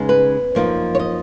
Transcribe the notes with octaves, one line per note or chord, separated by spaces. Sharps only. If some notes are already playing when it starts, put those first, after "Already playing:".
Already playing: C#3 G#3 B3 D#4
B4
F#2 F3 A#3 D#4
C#5
D#5